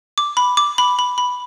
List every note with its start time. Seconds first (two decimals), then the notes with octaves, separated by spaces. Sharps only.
0.18 D6
0.37 B5
0.57 D6
0.78 B5
0.99 B5
1.18 B5